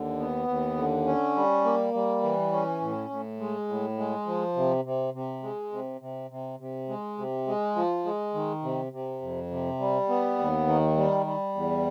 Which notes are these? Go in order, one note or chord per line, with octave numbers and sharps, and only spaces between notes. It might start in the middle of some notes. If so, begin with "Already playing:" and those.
Already playing: D#2 D3
B3
D#2
D3
C#4
G3
A#3
G3
E3
C#4
A2
A2
G#3
A2
G#3
F3
C3
C3
C3
G#3
C3
C3
C3
C3
G#3
C3
G#3
F3
G#3
D#3
C3
C3
F2
C3
G3
B3
D#2
D#3
G3
G3
E2